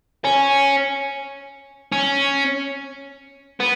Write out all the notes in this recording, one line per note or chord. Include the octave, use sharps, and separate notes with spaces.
C#4
C#4
B3